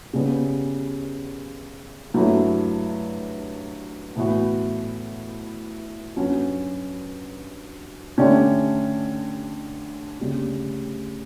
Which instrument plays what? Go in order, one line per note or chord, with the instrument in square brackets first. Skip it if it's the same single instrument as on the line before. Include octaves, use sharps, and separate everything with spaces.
[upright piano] C#3 G3 B3
G2 F#3 A3 E4
A2 E3 B3 F#4
G2 F#3 C#4 F#4
D3 A3 C#4 G4 D5
D2 C#3 G3